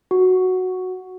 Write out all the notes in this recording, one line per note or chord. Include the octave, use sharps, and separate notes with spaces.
F#4